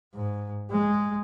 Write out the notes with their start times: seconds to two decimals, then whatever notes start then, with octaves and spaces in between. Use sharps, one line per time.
0.14 G#2
0.71 G#3